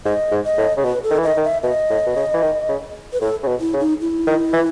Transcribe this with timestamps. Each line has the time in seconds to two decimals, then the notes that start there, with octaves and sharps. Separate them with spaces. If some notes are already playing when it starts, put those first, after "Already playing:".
0.05 G#2 D#5
0.32 G#2
0.45 D#5
0.58 A2
0.77 C#3
0.84 B2 B4
1.04 A4
1.11 D#3
1.18 E3
1.23 D#3 D#5
1.37 D#3
1.44 E5
1.63 B2 D#5
1.90 A2
2.07 B2
2.16 C#3
2.34 E3
2.43 D#3
2.69 C#3
3.13 B4
3.21 A2 A4
3.43 C#3
3.48 B2
3.60 E4
3.74 C#3
3.80 D#4
4.01 E4
4.27 D#3
4.53 E3